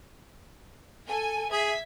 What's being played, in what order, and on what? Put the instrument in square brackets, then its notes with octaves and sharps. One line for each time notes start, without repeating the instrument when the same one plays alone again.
[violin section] A4 G#5
[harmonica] G#4 [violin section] E5 G#6 B6